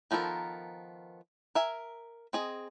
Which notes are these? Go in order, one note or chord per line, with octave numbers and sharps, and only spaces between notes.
D#3 F3 B3 A4 A#4
A#4 E5 G#5
C4 G#4 D#5